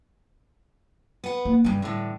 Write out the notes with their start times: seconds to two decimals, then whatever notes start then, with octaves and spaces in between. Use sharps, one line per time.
1.24 B3 F#5
1.45 A#3
1.64 G2 C#3 E3
1.82 A2 D3